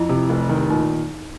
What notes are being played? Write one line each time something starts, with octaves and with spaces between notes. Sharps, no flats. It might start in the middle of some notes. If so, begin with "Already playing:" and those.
Already playing: F2 E4
C3
F1
D#3
A#2 D#4